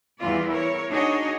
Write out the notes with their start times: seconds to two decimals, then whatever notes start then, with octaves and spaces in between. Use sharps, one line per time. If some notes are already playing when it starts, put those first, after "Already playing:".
0.20 E2 E3 G3 F4 D5
0.49 E4 A#4 C#5
0.90 D4 D#4 F#4 G#4 C#5 D#5